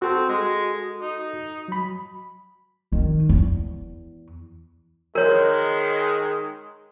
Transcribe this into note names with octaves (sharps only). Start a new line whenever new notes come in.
C4 F#4 A4
G#3
D#4
F#3 B5
D#3
E2
D#3 G#3 A#4 C#5